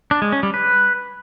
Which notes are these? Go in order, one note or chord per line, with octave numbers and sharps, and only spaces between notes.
D4
G#3
C#4
G3
B4